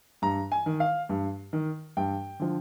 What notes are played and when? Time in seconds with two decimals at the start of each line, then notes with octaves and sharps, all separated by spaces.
0.22 G2 A#5
0.52 G#5
0.66 D#3
0.80 F5
1.09 G2
1.53 D#3
1.97 G2 G5
2.40 D3 F3